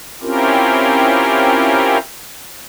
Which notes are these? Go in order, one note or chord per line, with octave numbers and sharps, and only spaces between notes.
C4 C#4 E4 F4 G4 A#4